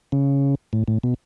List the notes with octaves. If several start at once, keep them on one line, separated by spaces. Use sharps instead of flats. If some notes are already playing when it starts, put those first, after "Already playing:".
C#3
A2
A2
B2